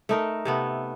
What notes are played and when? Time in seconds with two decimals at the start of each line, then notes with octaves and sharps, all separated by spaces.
0.09 A3 D#4 A#4
0.45 C3 A3 B3